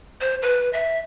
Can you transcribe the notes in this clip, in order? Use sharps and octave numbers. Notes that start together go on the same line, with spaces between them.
C5
B4
E5